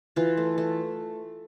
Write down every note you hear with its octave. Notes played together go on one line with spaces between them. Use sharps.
E3 F4
A3
A3